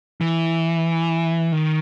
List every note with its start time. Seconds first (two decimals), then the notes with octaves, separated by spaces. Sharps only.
0.21 E3
1.52 D#3